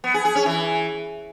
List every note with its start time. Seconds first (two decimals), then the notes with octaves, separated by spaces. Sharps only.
0.04 B3
0.14 G#4
0.25 G#4
0.35 C#4
0.46 E3